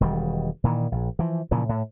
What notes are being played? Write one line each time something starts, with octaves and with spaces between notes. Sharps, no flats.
E1 D#3 G3
A#2 D#3 E3
A#1
E3 F3
A#2 C#3 E3 F3
A2